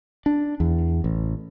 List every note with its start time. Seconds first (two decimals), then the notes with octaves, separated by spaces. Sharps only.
0.26 D4
0.60 E2
1.04 A1